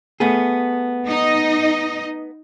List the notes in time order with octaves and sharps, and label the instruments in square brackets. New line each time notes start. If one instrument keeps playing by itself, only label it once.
[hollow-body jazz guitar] A3 B3 G#4
[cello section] D#4 D#5